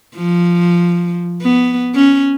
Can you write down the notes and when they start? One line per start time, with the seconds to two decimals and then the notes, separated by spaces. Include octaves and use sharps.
0.16 F3
1.42 B3
1.94 C#4